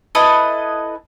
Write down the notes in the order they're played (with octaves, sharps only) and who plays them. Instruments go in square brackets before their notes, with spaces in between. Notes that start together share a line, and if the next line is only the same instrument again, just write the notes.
[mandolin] E4 A4 B4 D#5